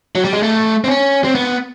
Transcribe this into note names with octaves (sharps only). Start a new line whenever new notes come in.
F#3
G3
G#3
A3
C4
C#4
C4
B3